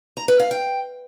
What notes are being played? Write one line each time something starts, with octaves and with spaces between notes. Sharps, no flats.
A#5
B4
F5
G5